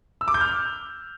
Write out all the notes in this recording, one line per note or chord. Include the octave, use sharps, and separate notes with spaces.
E6
D6
G6
F6